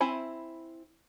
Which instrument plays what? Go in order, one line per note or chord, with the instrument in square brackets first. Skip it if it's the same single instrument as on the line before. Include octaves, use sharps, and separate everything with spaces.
[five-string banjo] C4 E4 G#5 B5